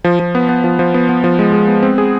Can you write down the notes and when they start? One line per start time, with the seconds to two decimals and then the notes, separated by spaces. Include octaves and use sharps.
0.04 F3
0.20 F3
0.35 B3
0.49 B3
0.64 F3
0.79 F3
0.94 B3
1.09 B3
1.24 F3
1.39 G#3
1.53 G#3
1.68 B3
1.83 C4
1.98 G#4